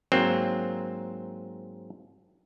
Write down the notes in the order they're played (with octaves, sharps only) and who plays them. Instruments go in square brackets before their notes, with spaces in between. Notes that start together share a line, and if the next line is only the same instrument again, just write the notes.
[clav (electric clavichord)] G#2 F#3 A#3 C4